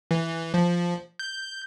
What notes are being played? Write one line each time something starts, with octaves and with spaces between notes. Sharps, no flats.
E3
F3
G6